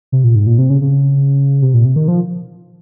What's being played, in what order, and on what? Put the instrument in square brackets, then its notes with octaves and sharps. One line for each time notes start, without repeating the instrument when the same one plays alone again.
[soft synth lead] C3
A#2
G#2
A#2
C3
C#3
C#3
C3
A#2
C3
D#3
F3